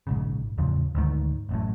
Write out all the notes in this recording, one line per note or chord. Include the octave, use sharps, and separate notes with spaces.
A#1 G#2 C#3
E2 A2 C#3 F3
D2 G#2 D#3
A1 F#2 A2